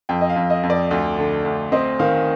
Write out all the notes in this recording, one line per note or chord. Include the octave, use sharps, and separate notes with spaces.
F2 G5
D#5
F5
F2
D#5
F2
D5
D2
D3
D2
C4 D#5
D#3 F5